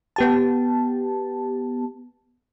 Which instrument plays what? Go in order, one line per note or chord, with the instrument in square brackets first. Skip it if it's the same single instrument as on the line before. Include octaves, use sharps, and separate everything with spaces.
[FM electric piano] B3 G4 A5